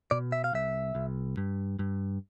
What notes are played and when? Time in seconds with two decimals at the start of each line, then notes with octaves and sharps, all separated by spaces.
0.11 B2 D5
0.32 E5
0.44 F5
0.53 C2 E5
0.95 C2
1.37 G2
1.79 G2